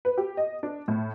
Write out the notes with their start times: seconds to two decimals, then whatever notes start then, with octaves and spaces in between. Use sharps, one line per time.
0.05 B4
0.18 G4
0.37 D#5
0.63 D4
0.88 A2